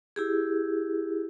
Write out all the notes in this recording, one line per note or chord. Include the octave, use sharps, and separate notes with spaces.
E4 G4 G#4